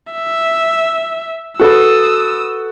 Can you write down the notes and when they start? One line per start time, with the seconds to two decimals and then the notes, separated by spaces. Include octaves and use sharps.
0.12 E5
1.59 F#4 A4 B4 D#6 E6